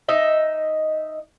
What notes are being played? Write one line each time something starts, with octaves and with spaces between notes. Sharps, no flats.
D#4 D#5 E5